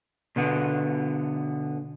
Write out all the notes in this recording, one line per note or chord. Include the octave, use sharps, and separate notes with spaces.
B2 D3 B3